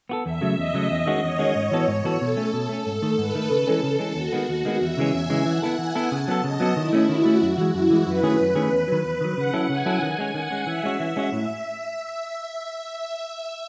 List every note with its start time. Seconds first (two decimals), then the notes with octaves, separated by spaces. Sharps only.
0.09 B3 F#4 A4
0.25 E2 E5
0.41 C#3 F#3 A3
0.57 E2 D#5
0.74 C#3 F#3 A3
0.91 E2
1.06 D#3 G#3 C#4 F#4
1.23 E2 C#5
1.39 D#3 G#3 C#4 F#4
1.55 G#2
1.72 E3 B3 F#4 A4
1.88 G#2
2.04 E3 B3 F#4 A4
2.21 B2 A4
2.37 A3 C#4
2.53 B2 A4
2.69 A3 C#4
2.86 G#2 A4
3.02 D#3 A3
3.18 G#2 B4
3.35 D#3 A3
3.51 C#3 A4
3.67 E3 G#3 C#4
3.83 C#3 A4
3.99 E3 G#3 C#4
4.15 D#2 F#4
4.32 D#3 G#3 B3
4.49 D#2
4.65 D#3 G#3 B3
4.81 E2 E5
4.97 C#3 E3 G#3 C#4
5.13 E2 G#5
5.30 C#3 E3 G#3 C#4
5.46 E3 F#5
5.62 B3 E4 A4
5.78 E3 G#5
5.95 B3 E4 A4
6.12 C#3 A5
6.28 F#3 B3 F#4 A4
6.44 C#3 D#5
6.60 F#3 B3 F#4 A4
6.77 D#3 E4
6.93 A3 C#4
7.09 D#3 F#4
7.25 A3 C#4
7.42 F#2 F#4
7.58 E3 G#3
7.74 F#2 E4
7.90 E3 G#3
8.07 F#2 B4
8.23 D#3 A3 C#4 G#4
8.39 F#2 B4
8.55 D#3 A3 C#4 G#4
8.72 E2
8.88 D#3 F#3
9.04 E2
9.21 D#3 F#3
9.36 C#3 F#5
9.53 F#3 C#4 E4 A4
9.69 C#3 G#5
9.86 F#3 C#4 E4 A4
10.01 D#3 G#5
10.18 G#3 C#4
10.34 D#3 F#5
10.51 G#3 C#4
10.67 E3 E5
10.83 G#3 C#4 F#4
11.00 E3
11.16 G#3 C#4 F#4
11.32 A2